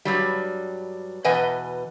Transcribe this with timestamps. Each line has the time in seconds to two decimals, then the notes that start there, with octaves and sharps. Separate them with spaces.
0.05 G2 F#3 G3
1.24 E2 B2 B4 D#5 F#5 G#5